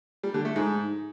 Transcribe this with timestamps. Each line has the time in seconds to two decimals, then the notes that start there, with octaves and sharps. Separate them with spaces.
0.23 G3
0.34 D3
0.45 A3
0.56 G#2